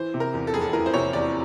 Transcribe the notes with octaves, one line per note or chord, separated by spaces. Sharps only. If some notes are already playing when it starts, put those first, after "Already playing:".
Already playing: E3 C5
C3
A#4
E2
A4
F1 G#4
A4
E3 A#4
C5
C3 C#5
E2 D5